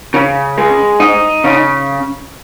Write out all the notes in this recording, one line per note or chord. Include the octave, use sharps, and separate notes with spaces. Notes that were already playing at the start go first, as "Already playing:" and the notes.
C#3
G#3
D#4
C#3